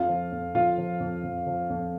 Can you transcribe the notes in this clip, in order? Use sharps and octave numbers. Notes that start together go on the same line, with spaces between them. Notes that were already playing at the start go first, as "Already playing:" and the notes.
Already playing: F2 F4 F5
F3
F2
F2 F4 F5
F3
F2
F2
F3
F2